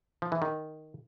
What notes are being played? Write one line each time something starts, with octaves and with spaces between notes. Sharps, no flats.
F3
E3
D#3